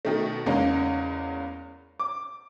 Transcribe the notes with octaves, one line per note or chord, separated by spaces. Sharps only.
B2 D#3 A3
E2 C#3 G#3 A#3 C#4 D#4
D6